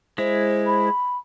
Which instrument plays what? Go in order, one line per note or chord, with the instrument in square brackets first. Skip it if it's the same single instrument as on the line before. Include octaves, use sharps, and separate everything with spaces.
[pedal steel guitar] G#3 E4 [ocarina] C5
[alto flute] B5